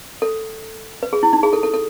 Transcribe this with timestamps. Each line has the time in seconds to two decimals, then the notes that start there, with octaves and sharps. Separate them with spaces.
0.22 A4
1.03 B4
1.13 G#4
1.23 E4
1.33 D#4
1.43 G#4
1.53 A4
1.63 A4
1.74 A4